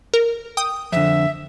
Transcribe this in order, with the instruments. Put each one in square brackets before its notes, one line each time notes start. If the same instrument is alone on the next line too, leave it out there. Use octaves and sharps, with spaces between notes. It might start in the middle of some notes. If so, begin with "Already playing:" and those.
[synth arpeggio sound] A#4
G5 D#6
[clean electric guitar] F2 D3 [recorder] E5